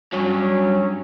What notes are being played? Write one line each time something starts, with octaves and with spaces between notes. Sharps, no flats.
G2 F#3 C#4